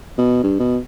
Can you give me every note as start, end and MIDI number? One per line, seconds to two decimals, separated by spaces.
0.18 0.41 47
0.43 0.55 43
0.59 0.77 47